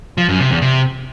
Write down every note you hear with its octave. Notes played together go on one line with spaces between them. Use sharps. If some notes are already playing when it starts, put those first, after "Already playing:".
F3
F#2
C3
E2
C3